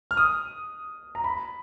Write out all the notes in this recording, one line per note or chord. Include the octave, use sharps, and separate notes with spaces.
F6
D#6
A#5
B5